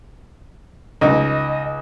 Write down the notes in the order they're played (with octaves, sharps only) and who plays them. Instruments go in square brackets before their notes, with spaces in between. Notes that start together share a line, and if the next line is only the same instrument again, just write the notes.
[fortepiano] C#2 D#4 [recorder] D#5